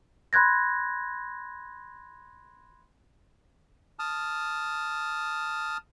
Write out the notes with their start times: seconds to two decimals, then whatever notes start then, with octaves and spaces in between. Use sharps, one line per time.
0.33 B5 C6 F#6 G#6 A#6
3.99 A5 D#6 F6